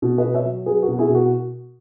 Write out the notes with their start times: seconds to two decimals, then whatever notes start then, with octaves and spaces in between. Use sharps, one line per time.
0.02 B2
0.18 B4 D#5
0.24 B2
0.34 C#5 E5
0.45 F#3
0.66 F#3 G#4 B4
0.82 F#4 A#4
0.88 B2
0.99 E4 G#4
1.09 B2
1.15 F#4 A#4